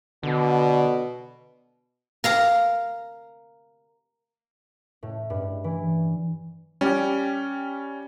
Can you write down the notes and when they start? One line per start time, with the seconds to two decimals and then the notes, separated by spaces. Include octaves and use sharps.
0.23 B2 D3
2.24 A#4 F5 A#5
5.03 A2
5.30 G2
5.64 E3
6.81 G3 C#4 G4